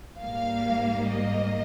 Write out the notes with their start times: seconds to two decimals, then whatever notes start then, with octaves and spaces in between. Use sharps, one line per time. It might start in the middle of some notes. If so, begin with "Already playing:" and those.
0.20 G#2 G3 A#3 F5
1.10 D#5